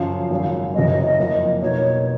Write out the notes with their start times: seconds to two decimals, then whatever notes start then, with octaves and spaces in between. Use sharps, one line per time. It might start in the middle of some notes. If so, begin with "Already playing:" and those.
Already playing: F#2 C#3 F3 F5
0.30 G#1 F#2 C#3 F#3
0.74 F#1 F#2 C#3 F#3 D#5
1.19 F2 F3 A#3
1.61 B2 A#3 D#4 C#5